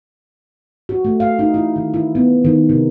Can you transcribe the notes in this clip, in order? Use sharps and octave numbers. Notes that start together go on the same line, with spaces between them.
F#4
A3
F5
D#4
E4
D#3
E4
B3
D#3
C3